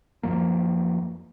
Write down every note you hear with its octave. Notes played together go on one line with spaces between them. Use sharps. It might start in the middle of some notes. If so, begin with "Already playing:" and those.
F#2 F3 A#3